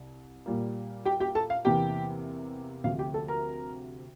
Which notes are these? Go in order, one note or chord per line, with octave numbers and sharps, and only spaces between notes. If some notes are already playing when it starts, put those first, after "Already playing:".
Already playing: C2
A#2 G3 A#3
G4 G5
G4 G5
A4 A5
F5
E2 C3 E3 A#3 G4 G5
D2 C3 F3 A3 F5
G4 G5
A4 A5
A#4 A#5